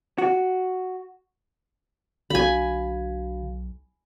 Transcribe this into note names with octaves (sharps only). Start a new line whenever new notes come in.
F#4
B1 D3 F#4 F5 G#5 B5